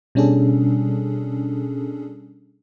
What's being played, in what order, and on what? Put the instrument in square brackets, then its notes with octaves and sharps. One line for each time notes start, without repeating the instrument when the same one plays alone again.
[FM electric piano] B2 G3 C#4 D4 G#4 A4